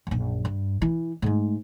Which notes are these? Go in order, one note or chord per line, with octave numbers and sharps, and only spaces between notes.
A#1 F#2
G2
E3
G#2 A3